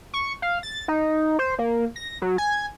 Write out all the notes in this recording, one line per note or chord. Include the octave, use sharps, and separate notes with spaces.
C#6
F5
A6
D#4
C5
A#3
A#6
F#3
G#5